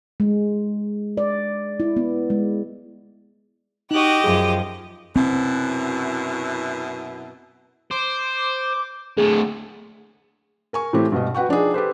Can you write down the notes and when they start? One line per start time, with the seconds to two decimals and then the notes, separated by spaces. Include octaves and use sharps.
0.20 G#3
1.17 D5
1.80 E4
1.97 B3
2.30 G#3
3.91 D#4 F#4 G4 D#5 F#6
4.24 F#2 F3 G#4
5.16 F#2 B2 C4 E4
7.91 C5 D6
9.18 D2 A2 G#4
10.73 A#4 G#5 C#6
10.93 A2 E3 A3 C4 G4
11.12 G2 B2 D#5
11.34 F#4 B4 F#5 G5 C#6
11.49 F3 D4 D#4 G#4
11.74 G4 A4 B4 C5